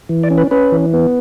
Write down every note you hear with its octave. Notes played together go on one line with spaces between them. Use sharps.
E3
D5
C#4
B4
C#4 B4
E3
B3